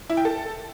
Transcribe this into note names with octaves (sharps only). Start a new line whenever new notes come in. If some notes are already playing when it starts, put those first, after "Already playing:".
E4
G5
A4